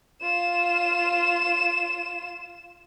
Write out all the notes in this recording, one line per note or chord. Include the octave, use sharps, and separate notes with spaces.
F4 E7